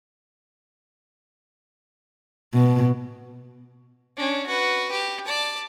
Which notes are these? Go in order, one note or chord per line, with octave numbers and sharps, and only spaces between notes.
B2
C#4 D4
F#4 B4
G4
D5 A5